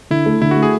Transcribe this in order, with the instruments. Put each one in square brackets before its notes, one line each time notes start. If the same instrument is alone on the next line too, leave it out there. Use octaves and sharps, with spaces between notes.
[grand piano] D3 [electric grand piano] E4
[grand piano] A3
[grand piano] D3 [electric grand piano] E4
[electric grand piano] F#4
[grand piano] A3
[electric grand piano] G#4